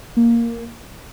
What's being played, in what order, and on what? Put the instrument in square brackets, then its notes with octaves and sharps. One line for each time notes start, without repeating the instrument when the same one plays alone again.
[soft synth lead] A#3